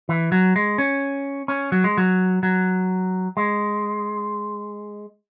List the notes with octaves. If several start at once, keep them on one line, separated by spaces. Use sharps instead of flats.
E3
F#3
G#3
C#4
C#4
F#3
G#3
F#3
F#3
G#3